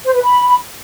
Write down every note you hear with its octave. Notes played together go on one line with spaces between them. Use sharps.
C5
B4
B5